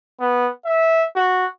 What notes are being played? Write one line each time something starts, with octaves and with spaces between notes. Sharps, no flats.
B3
E5
F#4